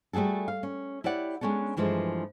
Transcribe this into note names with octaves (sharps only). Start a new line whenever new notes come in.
G3 A3 F#4 G#4 A4
F5
C#4
E4 G4 C#5 D5 F#5
G#3 B3 C#4 D4 A4
G2 E3 F3 G#3 A3